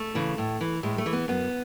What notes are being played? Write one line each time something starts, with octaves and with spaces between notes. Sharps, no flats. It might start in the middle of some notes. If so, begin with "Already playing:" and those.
Already playing: A3
C#3 E3
A2
E3
A2 G#3
A3
E3
B3
F#2 B3